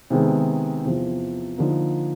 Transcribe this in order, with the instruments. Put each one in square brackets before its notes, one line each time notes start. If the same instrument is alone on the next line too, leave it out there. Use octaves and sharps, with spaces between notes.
[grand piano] C3 D#3 G#3 B3
E2 C3 F3
D3 F3 A#3 D#4